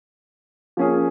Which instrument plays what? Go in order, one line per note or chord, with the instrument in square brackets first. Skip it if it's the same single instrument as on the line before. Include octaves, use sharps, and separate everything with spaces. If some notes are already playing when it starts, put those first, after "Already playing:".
[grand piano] F3 A#3 C#4 G#4